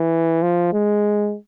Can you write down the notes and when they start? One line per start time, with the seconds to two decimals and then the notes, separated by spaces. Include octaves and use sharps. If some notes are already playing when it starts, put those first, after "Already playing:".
Already playing: E3
0.42 F3
0.73 G#3